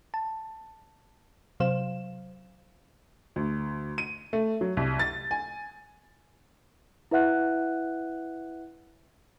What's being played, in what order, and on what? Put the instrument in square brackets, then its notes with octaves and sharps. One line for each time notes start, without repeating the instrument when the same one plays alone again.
[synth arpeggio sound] A5
C3 F#3 C5 F5 E7
[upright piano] D2
D#7
A3
F#3
C2
A6
G#5
[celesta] E4 B4 E5 F#5 F#6